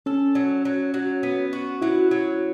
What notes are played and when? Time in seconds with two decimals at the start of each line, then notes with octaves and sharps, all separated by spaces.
0.06 C#4 A4
0.35 F#3
0.65 F#3
0.94 F#3
1.23 B3
1.53 F#4
1.82 F#3 E4
2.11 F#3